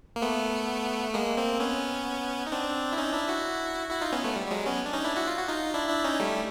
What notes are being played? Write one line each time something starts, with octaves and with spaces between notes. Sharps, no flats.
A#3
A3 B3
A3
G#3 A#3
A#3 C4
B3 C#4
D#4
C4 D4
E4
C#4 D#4
D4 E4
E4 F#4
E4 F#4
D#4 F4
B3 C#4
A3 B3
G3
G3
F#3 G#3
B3 C#4
D4
C#4 D#4
D4 E4
E4 F#4
F4
F#4
D#4 F4
D4 E4
D4 E4
C#4 D#4
G3 A3